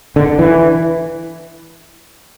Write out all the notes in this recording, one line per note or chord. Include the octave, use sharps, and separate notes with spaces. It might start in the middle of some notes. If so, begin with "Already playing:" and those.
D3
E3